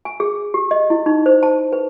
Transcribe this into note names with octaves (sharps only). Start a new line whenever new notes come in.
G#5
G#4
G4
D#5
E4
D#4
C5
A5
B4